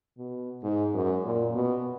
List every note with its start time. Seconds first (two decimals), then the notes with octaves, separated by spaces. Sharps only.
0.18 B2
0.63 G#2
0.94 F#2
1.24 A#2
1.54 B2